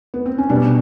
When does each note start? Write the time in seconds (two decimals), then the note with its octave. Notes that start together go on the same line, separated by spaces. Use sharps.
0.14 B3
0.26 C4
0.38 C#4
0.49 B2 G3 D4